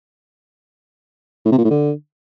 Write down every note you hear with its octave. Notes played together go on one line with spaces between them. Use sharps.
A2
C3
A#2
A2
D3